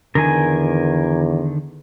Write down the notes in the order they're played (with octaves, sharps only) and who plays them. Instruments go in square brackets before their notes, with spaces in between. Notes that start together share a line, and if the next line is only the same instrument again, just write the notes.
[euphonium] E2 [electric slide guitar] D3 D#3 [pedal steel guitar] A#4 G#5